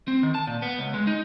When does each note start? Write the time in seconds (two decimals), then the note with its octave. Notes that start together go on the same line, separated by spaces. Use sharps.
0.08 C4
0.23 D#3
0.35 A5
0.47 A#2
0.62 B3
0.79 C#2
0.94 G#3
1.07 D#4